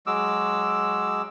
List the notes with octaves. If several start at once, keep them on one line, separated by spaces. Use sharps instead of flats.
F#3 G#3 D6 E6